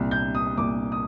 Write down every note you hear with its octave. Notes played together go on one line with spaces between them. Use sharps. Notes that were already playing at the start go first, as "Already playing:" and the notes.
Already playing: C2 A#2
G6
D#6
C2 A#2 D6
D#6